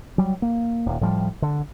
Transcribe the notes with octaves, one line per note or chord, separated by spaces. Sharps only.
F#3 G3
A#3
D#1
A2 F3 G3
D3